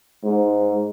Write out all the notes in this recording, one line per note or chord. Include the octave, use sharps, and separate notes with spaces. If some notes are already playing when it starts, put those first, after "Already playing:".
G#2